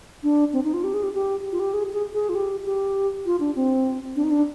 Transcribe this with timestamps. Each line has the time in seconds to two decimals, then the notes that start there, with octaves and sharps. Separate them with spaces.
0.23 D4
0.53 C4
0.64 D#4
0.74 F4
0.84 G4
0.94 G#4
1.03 G4
1.14 G4
1.52 F4
1.60 G4
1.74 G#4
1.93 G#4
2.14 G#4
2.29 F4
2.35 G4
2.65 G4
3.26 F4
3.40 D4
3.56 C4
4.16 D4
4.24 D#4
4.31 D4